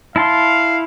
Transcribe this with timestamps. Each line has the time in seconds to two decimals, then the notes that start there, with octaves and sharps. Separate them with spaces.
0.16 E4 F5 A5 C6